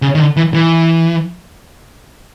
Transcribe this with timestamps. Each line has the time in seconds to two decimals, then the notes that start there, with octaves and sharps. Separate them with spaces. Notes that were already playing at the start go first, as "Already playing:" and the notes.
0.02 C#3
0.15 D#3
0.19 D3
0.37 E3
0.54 E3